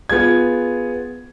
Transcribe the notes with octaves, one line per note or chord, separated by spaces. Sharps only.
B3 F4 G#4 G#6